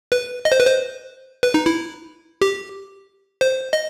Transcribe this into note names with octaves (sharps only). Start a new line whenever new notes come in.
B4
D#5
C5
B4
C5
B4
D#4
E4
G4
C5
D#5